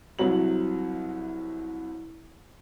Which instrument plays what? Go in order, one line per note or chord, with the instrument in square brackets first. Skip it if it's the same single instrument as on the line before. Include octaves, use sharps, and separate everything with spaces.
[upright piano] C2 C3 F#3 F#7